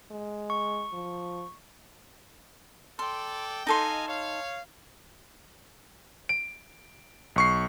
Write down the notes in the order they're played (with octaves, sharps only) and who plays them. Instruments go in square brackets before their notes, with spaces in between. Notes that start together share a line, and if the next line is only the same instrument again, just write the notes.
[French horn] G#3
[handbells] C#6
[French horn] F3
[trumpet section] A4 D5 G5 [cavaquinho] C6
[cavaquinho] D#4 A4 C6 [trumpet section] D#5 F5 G#5
[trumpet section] C#5 F5
[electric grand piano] D7
B1 C#6 C7